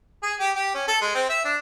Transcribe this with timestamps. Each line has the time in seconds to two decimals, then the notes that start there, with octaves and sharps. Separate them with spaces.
0.23 G#4
0.39 G4
0.56 G4
0.74 C#4
0.88 A4
1.01 G#3
1.15 C4
1.29 E5
1.45 D4